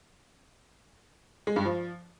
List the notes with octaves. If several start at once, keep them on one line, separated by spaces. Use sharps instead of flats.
G#3
G2
F3